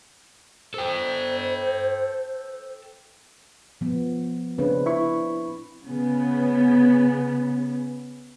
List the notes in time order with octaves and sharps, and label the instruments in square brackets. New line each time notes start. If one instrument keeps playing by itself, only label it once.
[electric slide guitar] A4 G5 [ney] C5
[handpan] F3 B3
[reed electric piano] C#3 [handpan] C4 D4 B4
[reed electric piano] E4 B5 C#6
[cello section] C#3 B3